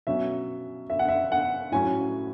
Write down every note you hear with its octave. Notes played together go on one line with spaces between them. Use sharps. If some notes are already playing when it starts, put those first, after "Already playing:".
B2 F#3 C#4 E5
E5
F#5
E5
F#5
A2 F#3 C#4 G#5